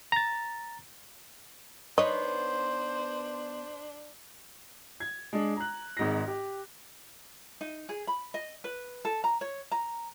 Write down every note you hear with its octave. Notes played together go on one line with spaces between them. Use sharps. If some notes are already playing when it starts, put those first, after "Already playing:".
A#5 A6
B3 D4 D#4 C5 C#5 D#5
G#6
G#3 D4
A#5 F#6
G#1 G#2 A#6
G4
D#4
G#4
B5
D#5
B4
A4
A#5
C#5
A#5